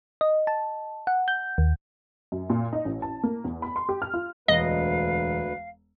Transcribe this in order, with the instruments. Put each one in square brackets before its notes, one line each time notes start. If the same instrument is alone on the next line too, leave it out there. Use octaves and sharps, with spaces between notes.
[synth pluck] D#5
A5
F#5
G6
D#2
[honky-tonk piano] F#2
A#2
D#4
A1
A5
A#3
E2
B5
C6
G4
F6
F4
[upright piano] E1 [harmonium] D2 B4 [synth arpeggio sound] D#5 [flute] F5